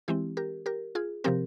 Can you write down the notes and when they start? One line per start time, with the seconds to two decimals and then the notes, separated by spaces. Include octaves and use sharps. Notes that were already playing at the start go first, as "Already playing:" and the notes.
0.08 E3 G#3 C4 E4 G4
0.37 G4 A#4
0.66 G4 A#4
0.95 F4 G#4
1.24 C3 F3 C4 G4 A#4